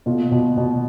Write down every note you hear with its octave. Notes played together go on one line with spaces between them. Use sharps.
B2 F4
B2
B2